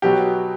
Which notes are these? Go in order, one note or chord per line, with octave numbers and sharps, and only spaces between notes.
B2 F#3 B3 G4